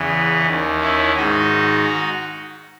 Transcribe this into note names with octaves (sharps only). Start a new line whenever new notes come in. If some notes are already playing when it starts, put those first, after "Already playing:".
Already playing: E2 C#3 E3
D#2 D#3
C#4 E4
G#2 D#3 D#4 F#4